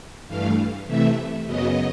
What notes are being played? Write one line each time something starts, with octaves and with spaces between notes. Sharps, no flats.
G2 E3 A3 F5
C3 E3 A3 E5
F#2 C#3 F#3 B3 D#5